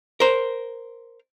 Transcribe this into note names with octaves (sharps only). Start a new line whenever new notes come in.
A#4 C5